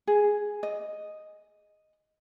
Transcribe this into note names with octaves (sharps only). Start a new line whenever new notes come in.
G#4
D#5